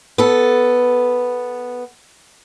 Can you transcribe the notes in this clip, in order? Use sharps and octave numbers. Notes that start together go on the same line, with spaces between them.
B3 A4